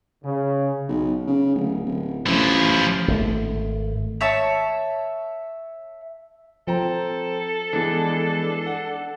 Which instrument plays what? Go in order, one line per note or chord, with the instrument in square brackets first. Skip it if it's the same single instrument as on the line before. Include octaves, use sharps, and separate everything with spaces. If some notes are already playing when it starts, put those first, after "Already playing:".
[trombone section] C#3
[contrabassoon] B1
C#3
D1
D1
[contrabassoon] A1 [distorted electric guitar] F3 E4
[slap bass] G#1 A3
[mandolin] C#5 E5 A5
[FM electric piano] F3 [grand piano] C4 G5 A#5 [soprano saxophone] A4
[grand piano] E3 G#3 B3 [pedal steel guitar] D4
[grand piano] F#5